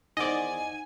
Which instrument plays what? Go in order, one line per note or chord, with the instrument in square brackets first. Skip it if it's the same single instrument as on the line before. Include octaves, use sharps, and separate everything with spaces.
[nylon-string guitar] E2 D#3 C5 [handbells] D#4 F#5 [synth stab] D5 D#5 [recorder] G#5